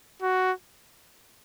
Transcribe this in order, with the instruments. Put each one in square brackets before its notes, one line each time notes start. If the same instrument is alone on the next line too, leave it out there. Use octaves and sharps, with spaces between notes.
[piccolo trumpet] F#4